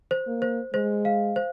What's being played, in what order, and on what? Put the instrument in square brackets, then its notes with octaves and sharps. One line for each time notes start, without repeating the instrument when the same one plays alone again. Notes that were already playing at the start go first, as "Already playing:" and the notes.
[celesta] C5
[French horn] A#3
[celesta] C5
[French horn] G#3 [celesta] C5
[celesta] F5
C5